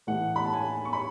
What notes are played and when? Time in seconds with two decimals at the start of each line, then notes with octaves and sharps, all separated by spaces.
0.07 A2 E3 A3 F#5
0.36 B5
0.44 A5
0.53 G#5
0.85 C#6
0.93 B5